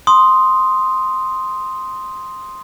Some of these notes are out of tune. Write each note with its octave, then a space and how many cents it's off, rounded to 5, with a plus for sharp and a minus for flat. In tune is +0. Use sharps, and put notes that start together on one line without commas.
C6 +0 D#6 +0